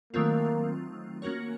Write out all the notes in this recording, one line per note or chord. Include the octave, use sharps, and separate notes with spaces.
D#3 F#3 A3 A#3 C4 F4
A#3 C#4 F#4 A#4 C#5